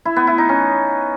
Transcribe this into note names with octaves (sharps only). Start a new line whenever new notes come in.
E4
B3
E4
D#4
C#4